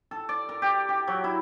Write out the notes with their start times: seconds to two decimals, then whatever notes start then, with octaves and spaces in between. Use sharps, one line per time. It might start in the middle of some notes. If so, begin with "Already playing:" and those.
0.11 A4
0.29 D5
0.49 A#4
0.62 G4
0.89 G4
1.07 F#3
1.24 E4